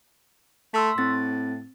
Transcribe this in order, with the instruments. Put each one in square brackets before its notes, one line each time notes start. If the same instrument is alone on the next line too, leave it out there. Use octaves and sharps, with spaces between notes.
[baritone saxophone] A3 [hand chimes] C6 E6 B6
[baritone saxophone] A2 [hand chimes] C4 A6